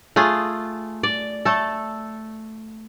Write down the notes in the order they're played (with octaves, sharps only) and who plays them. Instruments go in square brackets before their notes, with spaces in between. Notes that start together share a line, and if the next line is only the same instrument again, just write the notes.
[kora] A3 F4 G#4
D5
A3 A4